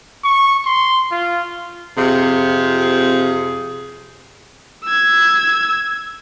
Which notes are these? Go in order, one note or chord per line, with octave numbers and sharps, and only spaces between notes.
C#6
C6
F4
F2 C3 F4 G#4
E6 G#6